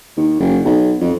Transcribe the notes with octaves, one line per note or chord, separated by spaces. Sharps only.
D#2
F#1
B1
F2